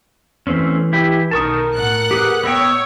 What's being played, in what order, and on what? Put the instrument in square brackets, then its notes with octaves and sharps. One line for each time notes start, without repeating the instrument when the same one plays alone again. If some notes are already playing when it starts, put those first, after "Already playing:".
[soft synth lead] E3 [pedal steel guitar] A3 C4 C#4
[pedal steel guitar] E4 G4
[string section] B1 D#3 [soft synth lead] A#4 [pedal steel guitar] A5 C#6 D#6
[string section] A2 F#5 F#6
[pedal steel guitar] G4 G#4 B4
[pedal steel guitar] B3 D#5 G5 [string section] C#5 [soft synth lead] E6